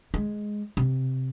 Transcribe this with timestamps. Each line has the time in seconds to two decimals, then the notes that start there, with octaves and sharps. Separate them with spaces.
0.14 G#3
0.77 C3